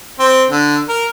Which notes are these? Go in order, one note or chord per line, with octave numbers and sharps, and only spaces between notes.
C4
D3
A#4